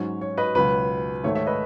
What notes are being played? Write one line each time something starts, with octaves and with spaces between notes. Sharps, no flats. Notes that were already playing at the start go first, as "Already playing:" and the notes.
Already playing: G#2 F#3 C#4 C#5
C#5
B4 D#5
C#2 B2 F#3 B4
G#2 D#3 A3 C#5
C#5 E5
B4 D#5